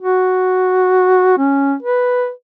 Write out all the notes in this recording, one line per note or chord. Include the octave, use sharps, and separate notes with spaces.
F#4
C#4
B4